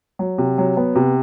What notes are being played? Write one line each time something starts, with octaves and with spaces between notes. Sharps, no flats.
F#3
C3
F#3
B3
C3